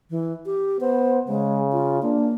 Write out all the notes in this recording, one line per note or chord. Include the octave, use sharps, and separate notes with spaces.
E3
G4
B3 C5
C#3 G#3
F4
A#3 D4